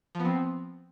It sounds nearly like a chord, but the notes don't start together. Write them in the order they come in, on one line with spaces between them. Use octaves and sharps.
F3 B3 C4